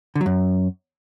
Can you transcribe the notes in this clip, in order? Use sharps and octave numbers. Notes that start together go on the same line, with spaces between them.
D3
F#3
F#2